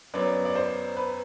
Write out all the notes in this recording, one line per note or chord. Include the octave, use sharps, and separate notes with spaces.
F#2 F#3 B3 D5
D5
C5
B4